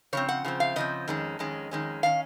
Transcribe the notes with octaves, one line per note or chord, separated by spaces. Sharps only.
C#3 F3 C4 C#5
F#5
C#3 F3 C4
F5
C#3 F3 C4 D#5
F2 D#3 G#3 C#4
F2 D#3 G#3 C#4
F2 D#3 G#3 C#4
D#3 C#4 F5